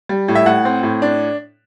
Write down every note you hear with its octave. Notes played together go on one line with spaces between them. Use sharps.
G3
A2
E5
A2 F#5
C4
A2
D4